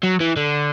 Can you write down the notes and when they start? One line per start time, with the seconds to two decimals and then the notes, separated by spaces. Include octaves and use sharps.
0.04 F#3
0.21 E3
0.37 D3